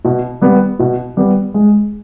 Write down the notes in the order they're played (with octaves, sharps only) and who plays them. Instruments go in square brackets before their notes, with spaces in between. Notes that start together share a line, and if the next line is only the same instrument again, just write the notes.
[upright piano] B2
G3 B3
B2
G3 B3
G#3